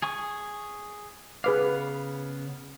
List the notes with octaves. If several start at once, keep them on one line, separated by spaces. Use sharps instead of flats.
G#4 G#5 C#6
C#3 B3 G#4 B4 F5 D6